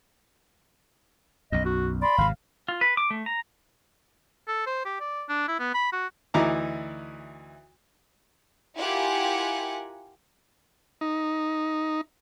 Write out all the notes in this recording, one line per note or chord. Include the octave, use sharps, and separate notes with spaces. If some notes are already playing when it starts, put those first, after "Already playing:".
B1 F#2 D#5
F#4
D5 B5 C6
G#1 C3 F5
F4
B4
D6
A3
A#5
A4
C5
G4
D5
D4
E4
B3
B5
F#4
D2 E3 D#4 E4 A#5 D6
E4 F4 G4 A#4 F#5 G#5
D#4